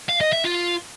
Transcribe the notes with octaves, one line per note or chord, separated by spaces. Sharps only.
F5
D#5
E5
F4